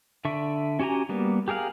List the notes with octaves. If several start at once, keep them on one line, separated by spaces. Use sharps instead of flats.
D3 D4 E5 C#6
C#4 F#4 G4 G#5 A#5
G3 A#3 B3
G4 G#4 A#4 F5 F#5